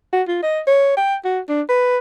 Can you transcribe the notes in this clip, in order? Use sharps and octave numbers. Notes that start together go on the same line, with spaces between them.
F#4
F4
D#5
C#5
G5
F#4
D4
B4